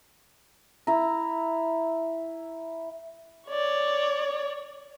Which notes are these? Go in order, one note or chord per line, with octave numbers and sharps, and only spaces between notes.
E4 A#5
C#5 D5